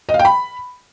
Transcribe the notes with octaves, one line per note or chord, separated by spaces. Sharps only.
D#5
F5
G5
B5